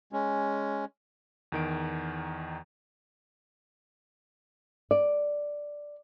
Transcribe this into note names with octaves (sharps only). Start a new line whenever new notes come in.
G#3 C#4
E2 D#3 D7
D5